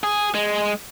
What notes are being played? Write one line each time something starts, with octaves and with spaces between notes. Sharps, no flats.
G#4
G#3